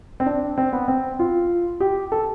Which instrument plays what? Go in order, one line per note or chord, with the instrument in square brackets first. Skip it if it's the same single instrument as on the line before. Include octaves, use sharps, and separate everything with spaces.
[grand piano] C4
D4
C4
B3
C4
F4
G4
A4